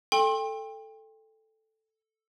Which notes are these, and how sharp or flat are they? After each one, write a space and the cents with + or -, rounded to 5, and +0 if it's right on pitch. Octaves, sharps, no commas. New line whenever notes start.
A4 +0 G5 +25 C6 +35